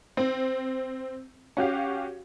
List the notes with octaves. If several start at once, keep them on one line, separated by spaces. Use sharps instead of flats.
C4
C#4 F#4 G4 F5